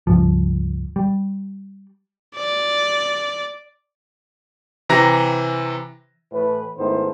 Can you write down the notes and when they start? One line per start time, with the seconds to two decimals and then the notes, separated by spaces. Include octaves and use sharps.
0.07 C#2 G2 F3
0.96 G3
2.37 D5
4.89 C3 E3 A#5 A#6
6.32 A2 E3 B4
6.78 G#2 D#3 A3 B3 E4 C5